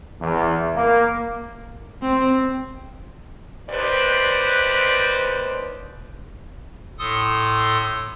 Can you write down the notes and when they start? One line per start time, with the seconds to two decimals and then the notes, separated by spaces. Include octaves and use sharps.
0.21 E2
0.74 A#3
2.02 C4
3.70 D#2 B4 C5 D5
6.99 A2 A4 C6 D#6 E6